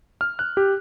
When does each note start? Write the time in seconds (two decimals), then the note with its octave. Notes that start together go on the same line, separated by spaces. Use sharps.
0.21 F6
0.39 F#6
0.57 G4